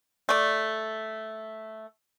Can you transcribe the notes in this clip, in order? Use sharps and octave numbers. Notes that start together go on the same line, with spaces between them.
A3 D5